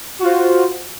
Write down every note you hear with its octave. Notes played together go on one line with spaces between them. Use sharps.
F4 F#4 C5